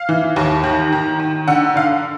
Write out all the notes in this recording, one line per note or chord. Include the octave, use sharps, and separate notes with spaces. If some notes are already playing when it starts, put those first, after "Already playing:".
Already playing: F5
E3
D#2
D#3
D#3
D#3
D3 F#5
D3 F5